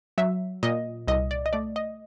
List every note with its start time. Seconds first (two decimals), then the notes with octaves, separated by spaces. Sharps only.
0.18 F#3 E5
0.63 A#2 D#5
1.08 C2 D#5
1.31 D5
1.46 D#5
1.53 A3 D5
1.76 D#5